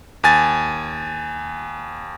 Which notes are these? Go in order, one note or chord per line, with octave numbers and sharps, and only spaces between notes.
D#2 G#5 A6